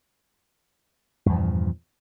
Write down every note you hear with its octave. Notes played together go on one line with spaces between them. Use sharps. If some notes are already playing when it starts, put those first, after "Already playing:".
E2 G2 A#2 F3